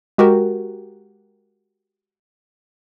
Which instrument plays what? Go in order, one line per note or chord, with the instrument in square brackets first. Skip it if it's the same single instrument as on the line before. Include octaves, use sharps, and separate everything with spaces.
[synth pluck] G#3 F#4 G4 A#4